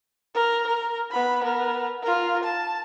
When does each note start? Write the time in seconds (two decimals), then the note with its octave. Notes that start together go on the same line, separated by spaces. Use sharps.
0.35 A#4
0.67 A#4
1.11 B3 B5
1.43 B3 A#4
2.03 F4 A#4
2.44 A5